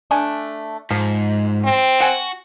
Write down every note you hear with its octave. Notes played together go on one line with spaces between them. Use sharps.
A3 D4 G#5
G#2 F3
C4
F#4 F#5 G#5